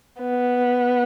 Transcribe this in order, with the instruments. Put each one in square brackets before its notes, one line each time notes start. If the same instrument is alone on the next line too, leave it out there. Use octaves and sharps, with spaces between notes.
[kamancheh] B3